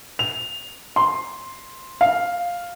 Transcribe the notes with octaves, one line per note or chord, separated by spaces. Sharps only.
F7
C6
F5